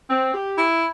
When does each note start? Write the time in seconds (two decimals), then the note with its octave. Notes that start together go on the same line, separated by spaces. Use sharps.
0.09 C4
0.33 G4
0.56 E4